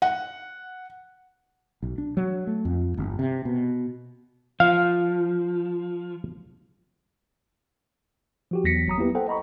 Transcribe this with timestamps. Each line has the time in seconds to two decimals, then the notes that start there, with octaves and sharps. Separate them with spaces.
0.02 F#5
1.82 B1
1.98 D4
2.17 F#3
2.47 A3
2.65 F2
2.97 G1
3.19 C3
3.45 B2
4.60 F3 F5
8.51 F3 F#4 G4
8.64 E2 F#3 A#6 B6 C#7
8.86 G1 F#3 A#5 D#6
8.98 A#3 B3 E4 G4 B4
9.15 A4 C5 F#5 G5
9.28 D#5 A#5 B5 C#6